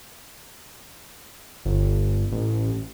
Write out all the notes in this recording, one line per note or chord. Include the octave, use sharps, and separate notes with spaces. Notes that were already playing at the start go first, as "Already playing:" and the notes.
G1
A1